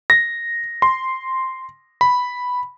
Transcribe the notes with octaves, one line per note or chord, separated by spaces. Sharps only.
A#6
C6
B5